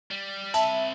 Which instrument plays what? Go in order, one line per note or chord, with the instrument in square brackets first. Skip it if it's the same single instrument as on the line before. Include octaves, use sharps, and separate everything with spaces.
[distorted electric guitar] G3
[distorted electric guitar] C4 B5 [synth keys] E5 [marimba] A5